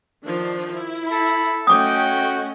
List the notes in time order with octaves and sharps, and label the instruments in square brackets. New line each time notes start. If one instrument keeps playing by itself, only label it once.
[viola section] D#3 F3 D4
E4
[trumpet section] A4 B5
[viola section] A3 C#4 D#5 [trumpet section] F#4 G5 [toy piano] D6 D#6